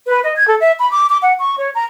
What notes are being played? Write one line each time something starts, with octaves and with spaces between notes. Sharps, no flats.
B4
D#5
G#6
A4
E5
B5
D6
D6
F#5
C#6
C#5
A#5